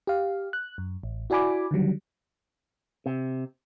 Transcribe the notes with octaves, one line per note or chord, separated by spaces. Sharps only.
G4 F5
F#6
F#2
A1
E4 F#4 D5 G#5 B5 D6
D3 D#3 F#3 G3
C3